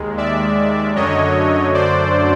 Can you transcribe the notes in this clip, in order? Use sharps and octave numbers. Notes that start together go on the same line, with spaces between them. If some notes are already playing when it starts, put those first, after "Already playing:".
Already playing: D#2 D#3 G#3
D5 E5
F#2 D3 F#3 A3 C#5 D#5
C5 D5